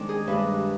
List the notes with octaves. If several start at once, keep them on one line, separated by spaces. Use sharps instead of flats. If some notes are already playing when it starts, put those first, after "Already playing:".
Already playing: D#3 G#3 C4 D4
G#4
G2 D#3 G#3 D4 B4